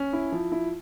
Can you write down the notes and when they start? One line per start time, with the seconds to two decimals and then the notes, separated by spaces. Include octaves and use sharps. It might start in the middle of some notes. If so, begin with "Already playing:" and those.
Already playing: C#4
0.13 E4
0.32 F3
0.52 E4